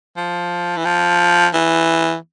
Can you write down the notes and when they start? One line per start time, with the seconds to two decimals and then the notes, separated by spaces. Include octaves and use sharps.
0.17 F3
0.77 E3
0.85 F3
1.54 E3